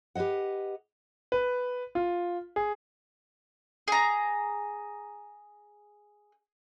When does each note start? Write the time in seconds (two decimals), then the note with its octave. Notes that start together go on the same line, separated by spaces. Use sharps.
0.15 G4 B4 C5 D#5 F#5
1.32 B4
1.95 F4
2.56 G#4
3.88 G#4 A#5